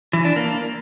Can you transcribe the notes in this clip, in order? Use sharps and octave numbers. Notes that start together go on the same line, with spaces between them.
E3
D4
A#3